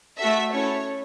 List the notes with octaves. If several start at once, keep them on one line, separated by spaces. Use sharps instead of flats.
A3 F#4 A4 E5
C#4 E4 A4 C#5